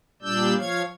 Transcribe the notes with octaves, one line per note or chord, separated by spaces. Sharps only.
A#2 G3 D4 D5 E6 G6
F3 C#5 F5 G#6